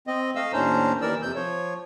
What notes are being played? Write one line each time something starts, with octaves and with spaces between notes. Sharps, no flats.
C4 D#5
A3 D#5 F5 E6
D#2 A2 C#4 D4 C5 A#5
D#2 E3 A#4 D5 E6
F2 C3 E6 G6
F3 C#5